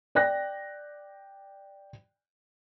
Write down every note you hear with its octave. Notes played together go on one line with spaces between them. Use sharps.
D5 G5 F#6 A#6